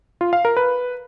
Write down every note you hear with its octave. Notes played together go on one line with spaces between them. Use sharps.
F4
F5
A#4
B4